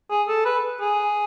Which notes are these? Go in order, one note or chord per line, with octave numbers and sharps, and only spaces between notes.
G#4
A4
B4
G#4